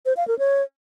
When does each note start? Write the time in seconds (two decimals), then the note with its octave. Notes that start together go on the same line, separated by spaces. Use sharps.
0.06 C5
0.17 F5
0.28 A#4
0.39 C#5